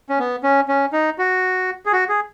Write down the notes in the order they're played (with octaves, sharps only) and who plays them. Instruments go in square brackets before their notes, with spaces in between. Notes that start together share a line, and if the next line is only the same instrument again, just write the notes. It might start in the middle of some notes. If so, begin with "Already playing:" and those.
[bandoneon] C#4
B3
C#4
C#4
D#4
F#4
G#4
F#4
G#4